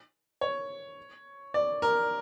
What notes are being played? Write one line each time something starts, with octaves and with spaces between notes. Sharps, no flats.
C#5
D5
A#4